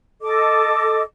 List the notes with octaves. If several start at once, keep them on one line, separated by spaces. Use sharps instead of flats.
A4 D#5 D6